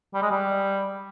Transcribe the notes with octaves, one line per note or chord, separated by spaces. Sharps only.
G3
G#3
G3